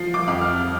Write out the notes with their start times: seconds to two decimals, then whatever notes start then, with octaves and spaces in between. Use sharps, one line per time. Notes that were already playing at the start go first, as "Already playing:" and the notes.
Already playing: F3 C7
0.14 D6
0.28 F2
0.41 F6